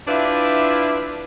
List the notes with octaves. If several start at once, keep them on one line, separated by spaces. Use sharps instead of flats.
D4 E4 F4 G4 B4 E5